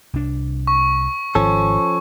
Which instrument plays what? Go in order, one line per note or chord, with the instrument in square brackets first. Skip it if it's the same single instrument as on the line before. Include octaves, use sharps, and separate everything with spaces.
[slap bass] C2 D4
[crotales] C#6
[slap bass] G#1 [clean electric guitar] F3 C#4 A4